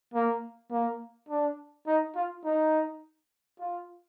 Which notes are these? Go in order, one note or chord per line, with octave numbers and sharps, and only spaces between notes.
A#3
A#3
D4
D#4
F4
D#4
F4